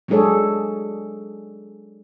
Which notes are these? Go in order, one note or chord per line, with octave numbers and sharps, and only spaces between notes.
F#3 G#3 D4 G#4 A4 C#5